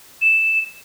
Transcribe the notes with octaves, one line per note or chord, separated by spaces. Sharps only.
E7